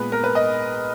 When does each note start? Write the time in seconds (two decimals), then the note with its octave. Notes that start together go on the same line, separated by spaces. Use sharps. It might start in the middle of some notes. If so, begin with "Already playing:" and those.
Already playing: A#2 G#3 B3 B4
0.12 A#4
0.24 B4
0.35 D#5